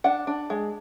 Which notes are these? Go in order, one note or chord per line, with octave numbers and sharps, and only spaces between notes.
D4 F#5
D4
G#3